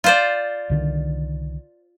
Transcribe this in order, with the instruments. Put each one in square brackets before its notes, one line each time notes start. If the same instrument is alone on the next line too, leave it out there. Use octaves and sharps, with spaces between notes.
[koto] F4 C5 D5
[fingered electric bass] C2 D3 D#3